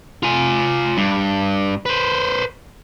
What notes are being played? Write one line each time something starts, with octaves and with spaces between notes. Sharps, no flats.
F4 G#5
G2
B4 C5